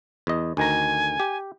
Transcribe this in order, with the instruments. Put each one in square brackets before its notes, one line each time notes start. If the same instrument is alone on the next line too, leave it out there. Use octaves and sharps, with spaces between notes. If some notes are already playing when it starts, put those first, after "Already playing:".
[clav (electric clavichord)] E2 D#5
[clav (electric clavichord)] D2 D#3 A#5 [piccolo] G#5
[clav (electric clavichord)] G4